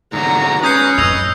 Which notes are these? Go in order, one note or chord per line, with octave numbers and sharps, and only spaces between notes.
G#2 D3 F#3 A#5
C#4 B4 D#6 G6 C7
F#2 A2 D#5 E6 F7